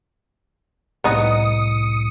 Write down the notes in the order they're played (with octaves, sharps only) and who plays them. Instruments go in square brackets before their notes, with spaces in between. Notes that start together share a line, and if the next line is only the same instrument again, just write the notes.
[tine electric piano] C2 A2 [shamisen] B3 D#4 [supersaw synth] D#6 C#7